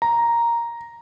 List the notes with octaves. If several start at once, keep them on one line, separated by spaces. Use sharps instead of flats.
A#5